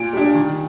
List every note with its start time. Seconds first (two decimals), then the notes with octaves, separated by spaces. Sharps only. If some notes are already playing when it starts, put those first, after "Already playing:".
Already playing: A#2 D7
0.13 G3 D4
0.35 D#3